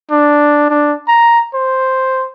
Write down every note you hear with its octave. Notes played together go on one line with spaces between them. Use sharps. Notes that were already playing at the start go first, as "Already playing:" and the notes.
D4
D4
A#5
C5